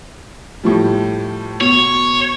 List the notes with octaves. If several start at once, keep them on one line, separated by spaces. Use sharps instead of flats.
A2 F3 G3
B2 C#5